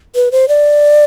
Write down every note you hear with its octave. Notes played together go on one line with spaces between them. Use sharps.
B4
C5
D5